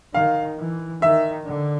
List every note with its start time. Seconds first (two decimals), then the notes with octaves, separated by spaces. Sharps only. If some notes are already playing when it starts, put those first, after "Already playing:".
0.14 D#3 F5
0.58 E3
1.02 D#3 E5
1.46 D3